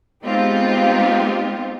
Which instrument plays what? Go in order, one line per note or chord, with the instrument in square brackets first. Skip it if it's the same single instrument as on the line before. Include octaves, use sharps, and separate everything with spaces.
[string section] G#3 B3 C4 D#4 F4 G4